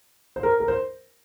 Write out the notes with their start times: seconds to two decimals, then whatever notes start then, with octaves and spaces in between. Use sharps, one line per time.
0.36 C5
0.43 A#4
0.60 A#4
0.68 C5